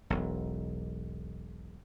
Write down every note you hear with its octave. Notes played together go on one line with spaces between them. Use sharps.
E1 B1